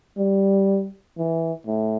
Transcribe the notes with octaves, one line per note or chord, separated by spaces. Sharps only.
G3
E3
A2